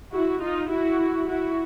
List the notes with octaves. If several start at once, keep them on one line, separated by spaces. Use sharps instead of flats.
E4 F#4
D#4 F4
E4 F#4
E4 F#4